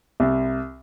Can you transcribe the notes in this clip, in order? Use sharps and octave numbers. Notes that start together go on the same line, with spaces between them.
C2